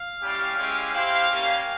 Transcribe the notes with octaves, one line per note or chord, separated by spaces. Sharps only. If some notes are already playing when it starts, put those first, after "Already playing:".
Already playing: F5
G3 C#4 E4 G4
G#3 C#4 E4 G4
C4 E4 G4 F5
G3 A#3 C#4 G4